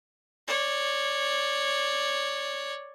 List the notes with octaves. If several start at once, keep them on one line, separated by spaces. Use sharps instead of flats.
C#5 D5